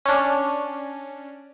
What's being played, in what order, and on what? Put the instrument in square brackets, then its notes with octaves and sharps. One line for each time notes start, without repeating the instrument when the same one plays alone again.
[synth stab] C#4 D4